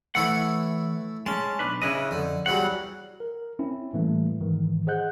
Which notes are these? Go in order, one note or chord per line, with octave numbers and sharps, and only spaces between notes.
E3 A3 E4 C#5 F#5
G#3 C#4 A5
B1 D4 B4
C#3 E4 B4 D#5
F2 D3
E2 F#3 G3 F#5
A#4
C4 C#4 E4
A2 E3 G3 A3 A#3
G#2 D#3 E3
G#4 C5 D#5 F#5 F#6 G6